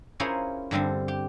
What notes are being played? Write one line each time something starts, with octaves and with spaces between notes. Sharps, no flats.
C#4 E4 F4 G#4 A#4 C5
G2 D3 G3 C4
G4